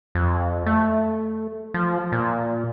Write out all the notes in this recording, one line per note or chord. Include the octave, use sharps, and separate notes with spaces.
F2
A3
F3
A#2